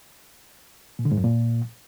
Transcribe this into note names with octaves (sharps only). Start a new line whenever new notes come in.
A#2
D3
G#2
F#2
A#2